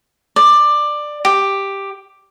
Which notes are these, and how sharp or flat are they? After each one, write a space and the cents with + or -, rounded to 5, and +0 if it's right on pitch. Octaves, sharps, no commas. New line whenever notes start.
D5 +15
G4 +5